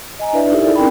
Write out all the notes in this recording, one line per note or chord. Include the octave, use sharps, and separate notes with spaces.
D#5 G#5 A#5
D4 E4 B4 D5 E5
D#4 E4 G4 A4 A#4 E5
D#4 E4 G#4 A4 D5
C4 C#4 A#4 G5 B5